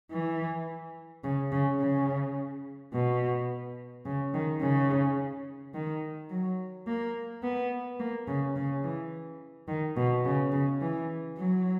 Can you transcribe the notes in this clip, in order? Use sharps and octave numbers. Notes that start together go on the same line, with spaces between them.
E3
C#3
C#3
C#3
B2
C#3
D#3
C#3
D#3
F#3
A#3
B3
A#3
C#3
C#3
E3
D#3
B2
C#3
C#3
E3
F#3